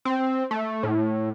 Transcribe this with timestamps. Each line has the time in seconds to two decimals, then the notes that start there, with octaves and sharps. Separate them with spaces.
0.05 C4
0.51 A3
0.83 A2